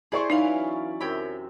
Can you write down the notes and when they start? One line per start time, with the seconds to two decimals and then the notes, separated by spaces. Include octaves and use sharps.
0.12 E4 G#4 C5 D5 C6 C#6
0.30 E3 F#3 C#4 D#4 B4 C#5 F5
1.01 F#2 C3 C#5 E5 G5 B5